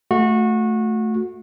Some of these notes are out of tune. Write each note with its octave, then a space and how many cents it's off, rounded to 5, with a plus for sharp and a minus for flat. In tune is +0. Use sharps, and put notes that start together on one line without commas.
A3 +0 F#4 -25